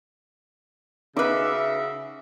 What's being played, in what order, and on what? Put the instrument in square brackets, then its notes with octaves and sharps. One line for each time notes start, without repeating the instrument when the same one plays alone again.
[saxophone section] C#3 F#4 E5 [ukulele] D#4 B4 [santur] D6